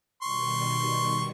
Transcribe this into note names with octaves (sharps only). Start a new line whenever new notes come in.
B2 D#3 G3 C6 C#6